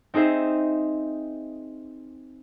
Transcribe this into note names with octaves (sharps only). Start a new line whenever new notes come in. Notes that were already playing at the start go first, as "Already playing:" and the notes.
C4 D#4 G#4 C5 E5